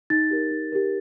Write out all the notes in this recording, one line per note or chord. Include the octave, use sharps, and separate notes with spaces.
D#4 A6
G4 A#4
D#4
G4 A#4